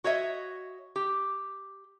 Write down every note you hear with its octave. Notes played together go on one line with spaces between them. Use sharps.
F#4 C#5 D#5 E5
G4